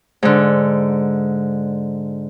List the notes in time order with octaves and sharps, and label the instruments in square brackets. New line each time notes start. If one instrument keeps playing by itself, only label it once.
[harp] G#2 D3